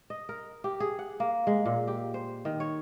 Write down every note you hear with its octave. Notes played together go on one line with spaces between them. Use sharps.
D#5
A#4
G4
G#4
F#5
A#3
G#3
A#2
G4
C5
D#3
C#5